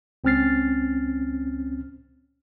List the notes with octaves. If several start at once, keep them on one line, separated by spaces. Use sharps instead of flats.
C#2 C4 C#4 F6 A6 C7